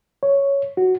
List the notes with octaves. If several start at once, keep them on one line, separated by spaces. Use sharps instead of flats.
C#5
F#4